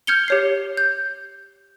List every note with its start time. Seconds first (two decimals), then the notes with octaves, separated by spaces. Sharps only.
0.07 F6 G6 G#6 C#7 F7 G7
0.28 G4 C#5 C7
0.77 G6